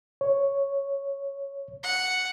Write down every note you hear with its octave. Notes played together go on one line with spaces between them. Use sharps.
C#5
F#5